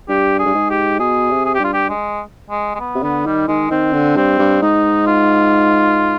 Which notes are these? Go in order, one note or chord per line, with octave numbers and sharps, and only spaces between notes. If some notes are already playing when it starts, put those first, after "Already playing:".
G2 G4
G#4
G2
G#2
G4
B2 G#4
C3
G#4
G4
G2 F4
G4
G#3
G#3
G#3
B3
C3
D3 B3
D#3 G3
D#3 G#3
D#3 C4
D3
G2 C4
G2
G#2 D#4
F4